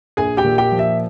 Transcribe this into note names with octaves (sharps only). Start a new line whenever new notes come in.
A#1 G#4 G#5
G4 G5
A#2
G4 G5
F3
E5